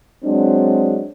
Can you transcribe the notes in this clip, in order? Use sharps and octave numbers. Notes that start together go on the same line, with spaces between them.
F#3 G#3 C4 D4